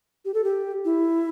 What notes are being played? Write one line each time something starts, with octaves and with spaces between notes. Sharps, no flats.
G4
A4
G4
E4